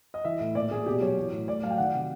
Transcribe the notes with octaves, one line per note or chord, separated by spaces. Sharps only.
D#5
E3 E5
A2
A#2 D5
A#2 G#4
B2 G4
F#3 C#5
E3
A2
A2 D5
F#3 F5
G5
D#3 F#5
C3 F#5